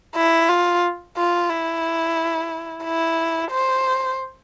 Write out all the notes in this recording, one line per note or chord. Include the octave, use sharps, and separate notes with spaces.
E4
F4
F4
E4
E4
C5